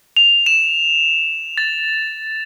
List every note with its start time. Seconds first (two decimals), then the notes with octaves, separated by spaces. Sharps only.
0.17 F7
0.46 E7
1.58 A6